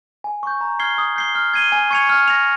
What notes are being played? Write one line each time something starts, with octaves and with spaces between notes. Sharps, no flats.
G#5
C#6 G6
A#5
F6 G#6 C7 G7
D#6
G6 C7 G7
F6
G#6 C7 D#7 G7
G#5
C#6 G#6 C#7 F7
F6
A#6 F7